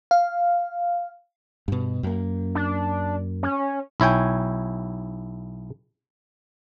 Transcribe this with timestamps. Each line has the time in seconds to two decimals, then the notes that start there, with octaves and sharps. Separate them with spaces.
0.11 F5
1.68 G2 B2
2.03 F#2 A#3
2.55 D4
3.43 C#4
4.00 B1 E4 C#5 G5 G#5